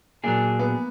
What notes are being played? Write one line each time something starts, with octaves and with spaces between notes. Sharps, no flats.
A#2 F#3 A#3 D4 G#4
B3